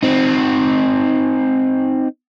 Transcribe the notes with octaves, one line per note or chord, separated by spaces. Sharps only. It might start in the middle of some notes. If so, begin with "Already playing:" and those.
C4 D#4